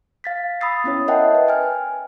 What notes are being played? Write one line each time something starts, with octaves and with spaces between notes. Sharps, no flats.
F5 A6 B6
B5 D#6 E6 A6 C7
B3 C#4 E4 C#5
A#4 D#5 E5 F#5 G5 A5
B4
G5 G#5 F6